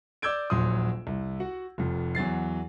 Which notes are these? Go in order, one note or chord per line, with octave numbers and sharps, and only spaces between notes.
D5 D6 E6 G6 G#6 D7
D#1 A#1 F#3 C6 D#6
C2
F#4 F#5
F1 F2
E2 F#3 A6 C7